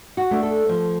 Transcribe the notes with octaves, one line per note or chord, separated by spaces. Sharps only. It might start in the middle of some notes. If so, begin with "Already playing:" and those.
F#4
A3 D4
A4
F3